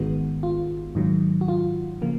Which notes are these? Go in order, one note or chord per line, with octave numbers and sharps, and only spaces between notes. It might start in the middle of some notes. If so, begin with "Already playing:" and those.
Already playing: G#1 G#2 D#3 G#3 B3 F#4
F4
G#2 D#3 F#3
F#4
F4
C#3 F3 A#3